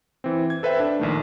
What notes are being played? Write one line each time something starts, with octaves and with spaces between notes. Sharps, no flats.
E3 C4
G#6
A4 B4 C5 E5 G5
D4
A#1 D#3 A3